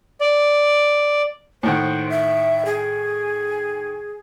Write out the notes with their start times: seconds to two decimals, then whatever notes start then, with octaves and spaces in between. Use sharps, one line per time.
0.20 D5
1.63 A2 D#3 C5 F#5
2.09 E5
2.66 G#4